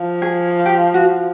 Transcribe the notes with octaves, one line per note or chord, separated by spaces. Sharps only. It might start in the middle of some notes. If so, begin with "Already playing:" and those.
Already playing: F3
G#4
G4
F#4